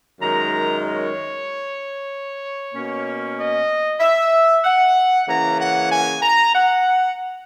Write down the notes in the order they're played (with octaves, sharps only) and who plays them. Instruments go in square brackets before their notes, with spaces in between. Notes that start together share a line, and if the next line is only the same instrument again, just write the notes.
[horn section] F#2 D#3 G#3 A#5
C#5
B2 A#3 C#4
D#5
E5
F#5
C#3 E3 A#3 C#4 A#5
F#5
G#5
A#5
F#5